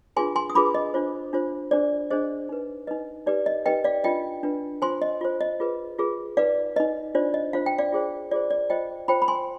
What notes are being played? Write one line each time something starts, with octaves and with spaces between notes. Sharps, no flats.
D4 F4 G#4 B4 G#5 C6
G#5 C6
D#6
D4 F4 G#4 B4 B5 D6
D#5
D4 F4 C5
D4 F4 C5
D4 G#4 C5 D5
D4 G#4 C5 D#5
D#4 B4
D#4 B4 D#5
D#4 G4 B4 D5
D#5
D#4 G4 B4 D#5 G5
D5 F5
D4 F4 B4 D#5 G5
D4 F4 B4
F4 C5 G#5 C6
D#5
F4 C5
D#5
F4 G#4 B4
F4 G#4 B4
D#4 B4 D5 F5
D#4 B4 D#5
D4 F4 C5 D5
D#5
D4 F4 C5 F5
G5
D5 F5
F4 G#4 C5
F4 G#4 C5 D5
D5
F4 C5 D#5 G5
F4 C5 G5 B5
B5
G#5 C6